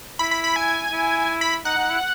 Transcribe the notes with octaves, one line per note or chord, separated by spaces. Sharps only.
E4 B5
B5
B5
G#5
E4
B5
D#4 F#5
D#4
E4